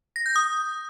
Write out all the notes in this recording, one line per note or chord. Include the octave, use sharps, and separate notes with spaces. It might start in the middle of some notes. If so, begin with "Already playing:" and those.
A#6
G6
D#6